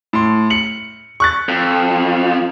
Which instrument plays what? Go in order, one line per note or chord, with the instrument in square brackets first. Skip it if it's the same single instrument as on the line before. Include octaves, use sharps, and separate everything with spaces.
[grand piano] A2 C6
C#7 F#7
C#6 F#6 A6
[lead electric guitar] F2